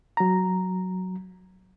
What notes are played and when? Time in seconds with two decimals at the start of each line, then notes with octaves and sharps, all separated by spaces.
0.17 F#3 A#5